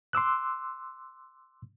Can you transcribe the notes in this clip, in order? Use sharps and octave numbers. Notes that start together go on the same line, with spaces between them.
C6 D6 E6 F#6